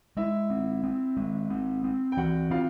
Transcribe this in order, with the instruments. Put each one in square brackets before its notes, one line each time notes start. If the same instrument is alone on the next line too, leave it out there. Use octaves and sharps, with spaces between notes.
[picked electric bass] G#3 [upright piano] E4 E5
[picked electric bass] C4
C4
G#3
C4
C4
[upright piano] G5
[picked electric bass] E3 [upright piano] F#4 F#5
[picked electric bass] C4 [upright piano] F4 F5